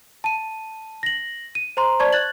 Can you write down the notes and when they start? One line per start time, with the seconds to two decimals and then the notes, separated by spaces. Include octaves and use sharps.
0.24 A5 D#7
1.03 A#6 F#7
1.55 D#7
1.77 C5 A#5 C6
2.00 C5 D5 A5 C#6 G#6
2.12 F#6 G#6 A6 F#7